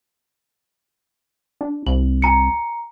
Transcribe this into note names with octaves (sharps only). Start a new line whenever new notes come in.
D4
C2 F#7
G#5 A#5 C#7